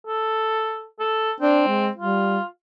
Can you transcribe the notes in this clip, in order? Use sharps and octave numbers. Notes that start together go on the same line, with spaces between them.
A4
A4
C4 D4
G#3
G3 F4